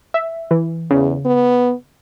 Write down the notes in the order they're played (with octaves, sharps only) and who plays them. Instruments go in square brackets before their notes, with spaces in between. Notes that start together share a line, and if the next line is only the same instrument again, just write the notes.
[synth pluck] E5
E3
[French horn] E2 [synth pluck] C#3
[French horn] B3